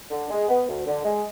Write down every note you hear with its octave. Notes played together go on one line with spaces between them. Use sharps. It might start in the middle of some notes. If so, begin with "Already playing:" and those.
D3
G#3
B3
D2
D3
G#3